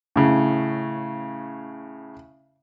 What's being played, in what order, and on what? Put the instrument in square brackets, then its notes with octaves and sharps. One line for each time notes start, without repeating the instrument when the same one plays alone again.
[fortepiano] A2 C#3